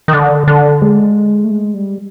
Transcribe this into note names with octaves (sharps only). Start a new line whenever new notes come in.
D#3
D3
D3
G#3
A3
G#3
G3